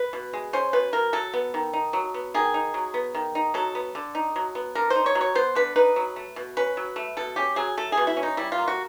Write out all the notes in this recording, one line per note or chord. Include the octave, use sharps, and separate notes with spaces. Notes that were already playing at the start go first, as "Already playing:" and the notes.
Already playing: B4
B2
G#3
C#4 C5
B2 B4
B2 A#4
F#3 A4
B3
D#3
D#4
F#3
B3
D#3 G#4
D#4
F#3
B3
D#3
D#4
F#3 A4
B3
D3
D#4
F#3
B3
D3 A#4
C5
D#4
C#5
F#3
C#5
B3 C5
D3 B4
D#4 B4
F#3
A3
B2
C#4 B4
F#3
A3
B2 A4
C#4 G4
F#3 G#4
A3 A4
G#4
B2
E4
C#4
D#4
G3 E4
F4
A#3
F#4